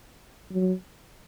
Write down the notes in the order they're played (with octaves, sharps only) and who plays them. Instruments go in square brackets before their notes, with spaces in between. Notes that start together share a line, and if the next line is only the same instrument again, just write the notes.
[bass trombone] F#3